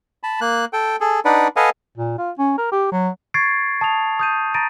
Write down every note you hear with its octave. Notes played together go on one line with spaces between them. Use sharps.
A5 B5
A#3 F#6
A4 G5
G#4 A4
D4 D#4 B4 D5 F#5
A4 B4 D#5 F5 F#5 G#5
A#2
F4
C#4
A#4
G4
F#3
C#6 G#6 A6 C7 D7
A5 D#6 C7 F7
D#6 G6 D#7
A#5 A6 A#6 D7 D#7